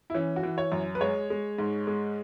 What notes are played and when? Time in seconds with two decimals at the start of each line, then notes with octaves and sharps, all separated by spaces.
0.10 E4
0.14 E3 C#4
0.36 F#4
0.43 E3
0.58 C#5
0.72 F#2
0.95 B4
1.01 G#3 C#5
1.30 G#3
1.59 G#2
1.87 G#3